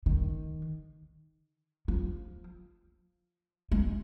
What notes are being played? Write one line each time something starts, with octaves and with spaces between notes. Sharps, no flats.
D#3
F3
G#3